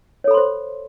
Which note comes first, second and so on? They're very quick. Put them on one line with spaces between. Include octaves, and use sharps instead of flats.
C#5 A4 B5 C6 C5